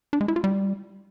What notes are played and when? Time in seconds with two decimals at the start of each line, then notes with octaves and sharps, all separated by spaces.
0.13 D4
0.21 G#3
0.28 E4
0.36 F4
0.44 G3